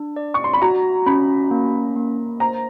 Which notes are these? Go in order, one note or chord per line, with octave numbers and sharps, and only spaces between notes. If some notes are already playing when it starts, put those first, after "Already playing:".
Already playing: D4
D5
C#6
C6
B5
F#4 A#5
C#4 B5
A#3
A#3
C5 A#5